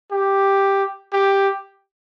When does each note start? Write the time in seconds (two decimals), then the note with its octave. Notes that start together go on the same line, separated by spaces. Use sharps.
0.12 G4
1.13 G4